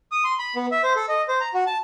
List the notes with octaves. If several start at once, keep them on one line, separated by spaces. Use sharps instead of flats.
D#6
C6
B5
B3
E5
C5
A4
D#5
C5
A#5
F#4
A5